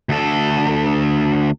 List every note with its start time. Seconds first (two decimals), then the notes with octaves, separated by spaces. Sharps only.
0.09 D2 A4